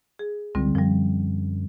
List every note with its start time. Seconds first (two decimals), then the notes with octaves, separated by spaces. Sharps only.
0.19 G#4
0.55 C#2 D3 G3 C4
0.75 F#2 F3 G3